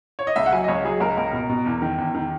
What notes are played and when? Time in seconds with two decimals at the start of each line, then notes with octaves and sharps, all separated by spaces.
0.19 C#5
0.27 D#5
0.36 C#2 E5
0.46 F#5
0.52 F#3 G#5
0.64 D#5
0.68 C#2 C#5
0.85 F#3 G#4
1.00 C#2 A#4
1.17 C#2
1.33 B2
1.49 B2
1.66 E2
1.82 D#3
1.98 E2
2.15 D#3